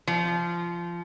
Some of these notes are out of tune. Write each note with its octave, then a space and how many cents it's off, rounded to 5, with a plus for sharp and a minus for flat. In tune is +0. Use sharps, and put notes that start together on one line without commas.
F3 -20